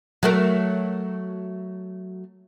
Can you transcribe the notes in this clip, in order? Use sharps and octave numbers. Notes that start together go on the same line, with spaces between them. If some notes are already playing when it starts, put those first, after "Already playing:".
F#3 A3 A#4